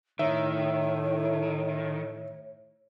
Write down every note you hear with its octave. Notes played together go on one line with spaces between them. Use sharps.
A2 D#3 C#5 E5